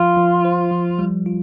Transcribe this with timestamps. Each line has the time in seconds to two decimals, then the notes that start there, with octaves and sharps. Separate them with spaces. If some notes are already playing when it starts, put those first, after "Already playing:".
Already playing: F3 F4
0.17 F3
0.45 C5
0.71 F3
0.99 G3
1.26 F4